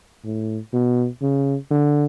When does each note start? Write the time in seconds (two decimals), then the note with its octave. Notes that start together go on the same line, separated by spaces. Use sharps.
0.24 A2
0.74 B2
1.22 C#3
1.71 D3